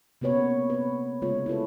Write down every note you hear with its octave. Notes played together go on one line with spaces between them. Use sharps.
C3 A#3 B3 B4 C#5
B4
C#3 G#3 F4 C#5
E4 F4 A4 B4